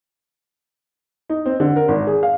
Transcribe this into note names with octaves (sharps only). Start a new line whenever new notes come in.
D#4
C4
D3
A#4
G#1
G#4
F5